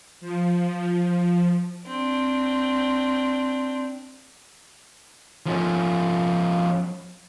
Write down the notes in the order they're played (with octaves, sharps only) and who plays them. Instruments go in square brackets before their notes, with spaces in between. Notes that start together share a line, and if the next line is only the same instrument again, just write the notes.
[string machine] F3
[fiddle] C4 D4
[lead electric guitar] F3 C#4